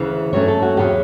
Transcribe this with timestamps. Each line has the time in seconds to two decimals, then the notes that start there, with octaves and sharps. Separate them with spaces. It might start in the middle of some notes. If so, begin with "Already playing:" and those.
Already playing: D2 C#3 E3
0.33 G2 F#3 A3 C#4 C#5
0.48 A4
0.62 F#4
0.77 E2 C#3 F#3 G4